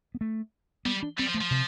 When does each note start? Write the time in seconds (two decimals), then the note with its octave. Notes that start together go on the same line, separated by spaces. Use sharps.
0.15 B3
0.21 A3
0.85 G3 B3
1.03 D4
1.19 G3 C4
1.26 F3
1.34 A3
1.41 F3
1.51 C3